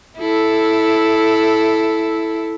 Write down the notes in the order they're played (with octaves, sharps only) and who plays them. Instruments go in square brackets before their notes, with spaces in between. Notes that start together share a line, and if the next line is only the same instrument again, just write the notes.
[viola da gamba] E4 A4